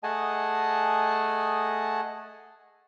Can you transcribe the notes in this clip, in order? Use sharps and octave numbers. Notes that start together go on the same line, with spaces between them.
A3 G#4 D#5 F#5 G#5 A5